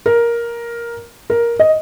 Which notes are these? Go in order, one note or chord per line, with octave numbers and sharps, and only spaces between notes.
A#4
A#4
D#5